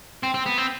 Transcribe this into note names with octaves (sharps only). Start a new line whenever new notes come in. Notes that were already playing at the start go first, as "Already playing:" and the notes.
C4
C4
B3
C4